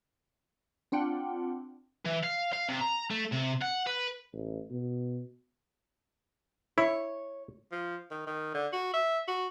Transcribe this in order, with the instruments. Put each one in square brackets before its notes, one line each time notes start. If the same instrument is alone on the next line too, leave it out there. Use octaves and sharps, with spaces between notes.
[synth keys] C4 D4 F4 F#5 G5
[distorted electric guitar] E3
F5
F5
C3
A#5
A3
C3
F#5
B4
[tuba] A1
B2
[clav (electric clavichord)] E4 [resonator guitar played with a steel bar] C#5
[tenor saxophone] F3
D#3
D#3
D3
F#4
E5
F#4